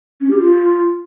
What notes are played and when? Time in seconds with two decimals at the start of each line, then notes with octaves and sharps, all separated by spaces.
0.21 C#4
0.31 G4
0.40 F4